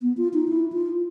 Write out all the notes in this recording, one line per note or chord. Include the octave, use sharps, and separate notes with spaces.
B3
F4
D#4
E4
F4